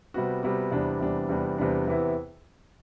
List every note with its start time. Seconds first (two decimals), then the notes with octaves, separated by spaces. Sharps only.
0.14 C3 G3 B3 F#4
0.43 C3 G3 B3 F#4
0.72 E2 C3 G3 B3 D4
1.00 E2 C3 G3 B3 D4
1.29 E2 C3 G3 B3 D4
1.58 E2 C3 G3 B3 D4
1.87 E2 C3 E3 B3 E4